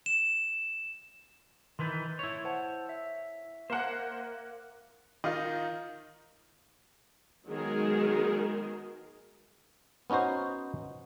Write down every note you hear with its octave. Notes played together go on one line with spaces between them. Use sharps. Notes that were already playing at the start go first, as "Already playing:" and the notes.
E7
D#3 E3 B4 C6 G6 A6
E4 C#5
C5 F#5 A5
E5
A#3 A#4 C5 F#5
D#3 D#4 F4 D#5
D#3 F#3 G#3 B3 G#4 A#4
B3 C#4 D#4 F#4 C5